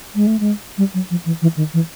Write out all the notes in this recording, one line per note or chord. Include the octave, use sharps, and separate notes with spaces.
G#3
A3
G#3
G3
F#3
F3
E3
E3
D#3
E3